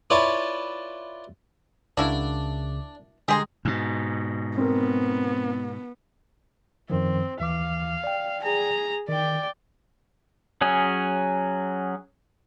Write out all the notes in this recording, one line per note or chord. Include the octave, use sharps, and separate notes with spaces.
E4 F4 B4 C#5 D5 A5
C#2 C#3 A#3 D4 E4 F#4
D3 G#3 G4 G#5 A#5 C6
G#2 B2
B3 C4 A#4
F#2 D#3 F3 C4
D#2 E3 F5 D6
D5 G5
G#4 A#5
D#3 D5 G5
F#3 C#4 G#4